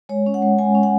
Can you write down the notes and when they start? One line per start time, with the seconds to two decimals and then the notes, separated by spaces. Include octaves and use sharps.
0.09 G#3 C#5
0.26 C#4
0.34 F#5
0.42 G#3
0.59 G#3 G#5
0.75 C#4
0.83 F#5